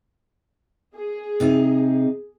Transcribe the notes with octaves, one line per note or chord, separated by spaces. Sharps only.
G#4
C3 D#4